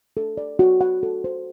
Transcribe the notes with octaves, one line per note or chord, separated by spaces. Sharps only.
A4
D5
F#4
F#5
A4
C5